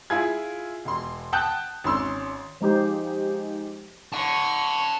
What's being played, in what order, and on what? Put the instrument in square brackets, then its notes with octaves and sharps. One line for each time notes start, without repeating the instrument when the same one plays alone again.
[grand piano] E4 F4 G#4 G#6
E1 C6
F#5 G5 A5 D#6 F#6 G6
G#1 C#4 C6 E6
[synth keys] F3 G#3 D#4 G4 C5
[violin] C#5 C#6 [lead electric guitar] F#5 A5